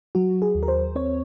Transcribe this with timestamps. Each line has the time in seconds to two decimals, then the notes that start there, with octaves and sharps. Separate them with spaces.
0.15 F#3 F#4
0.42 G#4
0.55 D#2
0.63 A#4
0.68 C5
0.96 C4 C#5